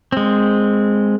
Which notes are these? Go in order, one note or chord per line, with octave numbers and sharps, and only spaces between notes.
G#3 C4